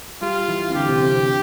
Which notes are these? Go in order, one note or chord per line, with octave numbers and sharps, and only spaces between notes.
G3 F4 G4
E3 E4
C4
D3 D4 G4
C3 C4
C3 C4
C3 C4